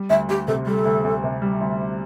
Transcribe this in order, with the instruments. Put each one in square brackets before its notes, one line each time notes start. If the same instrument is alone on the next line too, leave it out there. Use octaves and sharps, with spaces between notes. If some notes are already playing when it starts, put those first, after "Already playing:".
Already playing: [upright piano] G3
[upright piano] D2 [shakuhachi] E5
[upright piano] D2 [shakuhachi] G4
[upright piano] C3 [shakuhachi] A4
[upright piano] G3 [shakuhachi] A4
[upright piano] D2
D2
C3
G3
D2